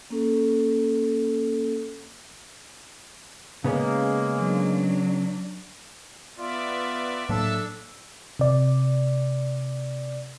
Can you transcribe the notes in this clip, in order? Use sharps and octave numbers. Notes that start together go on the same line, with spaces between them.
A#3 C#4 A4
C#3 G#3 A#3 B3 C#4
F#3 D4
B3 F4 D5 E5
A2 F#3 A#3 D4 A4 E5 A5 E6
C3 D5